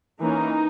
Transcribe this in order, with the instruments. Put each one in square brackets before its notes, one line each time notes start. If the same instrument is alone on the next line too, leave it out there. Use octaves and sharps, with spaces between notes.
[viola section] E3 A#3 C#4 D#4